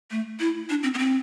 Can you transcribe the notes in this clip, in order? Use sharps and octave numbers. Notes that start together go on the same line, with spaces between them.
A3
E4
D4
C4
B3
C4